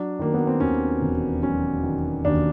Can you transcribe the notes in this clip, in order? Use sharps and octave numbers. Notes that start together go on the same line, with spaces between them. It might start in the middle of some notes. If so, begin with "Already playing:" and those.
Already playing: F#3 D4
D#3 A#3
B3
C4
D#2 C#4
E1
F#3 C#4
D#3
D#2 D4